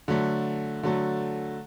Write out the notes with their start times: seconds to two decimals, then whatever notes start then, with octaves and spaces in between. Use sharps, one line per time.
0.08 D3 F#3 A3
0.83 D3 F#3 A3